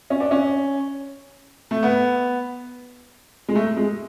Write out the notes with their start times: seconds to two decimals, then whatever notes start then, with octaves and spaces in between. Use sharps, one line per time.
0.10 C#4
0.20 D4
0.31 C#4
1.71 A3
1.83 B3
3.49 G#3
3.55 A3
3.77 G#3